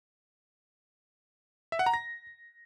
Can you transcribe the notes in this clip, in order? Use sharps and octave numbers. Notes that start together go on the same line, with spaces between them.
E5
F#5
A#5
A#6